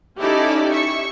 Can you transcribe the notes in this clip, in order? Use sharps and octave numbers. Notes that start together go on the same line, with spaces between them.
C#4 D#4 E4 G4 A4 D5
E5 C#6